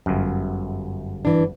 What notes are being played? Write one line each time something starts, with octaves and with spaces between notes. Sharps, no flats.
G1 F#2
E3 D4